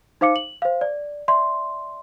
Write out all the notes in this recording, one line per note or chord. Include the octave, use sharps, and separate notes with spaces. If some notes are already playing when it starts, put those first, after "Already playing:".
D#4 C5 F5 D6 C#7
F#7
C5 F5
D5
D5 E5 C6